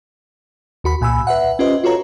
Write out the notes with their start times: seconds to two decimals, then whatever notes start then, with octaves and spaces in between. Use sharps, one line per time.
0.84 D#2 F#4 B5
1.01 C2 A#2 G#5 B5 E6
1.27 B4 E5 F#5
1.59 C#4 F4 G4 B4 C5 D#5
1.84 F4 F#4 A4 B4 C#5 A#5